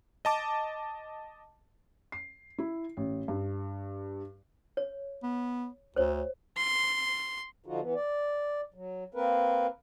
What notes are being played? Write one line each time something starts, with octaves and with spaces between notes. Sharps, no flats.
D#5 A5 D6
C7
E4
A1
G2
C#5
B3
D2 C5 C#5
C6
D3 F3 D#4 F4 F#4
E3 B3
D5
F#3
A#3 C4 A#4 B4